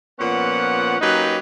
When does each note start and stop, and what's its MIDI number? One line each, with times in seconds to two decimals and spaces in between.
0.19 0.95 46
0.19 0.95 53
0.19 0.95 59
0.19 0.95 61
0.19 0.95 78
1.01 1.39 54
1.01 1.39 58
1.01 1.39 61
1.01 1.39 63
1.01 1.39 67
1.01 1.39 71